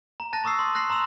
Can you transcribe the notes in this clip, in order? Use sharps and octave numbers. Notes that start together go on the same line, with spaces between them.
A#5
A5 F#6 A6 A#6
A#5 C#6 D#6 E6 C7
C6
F#6 A#6 C7 F#7
A#5 C6 E6 E7 F7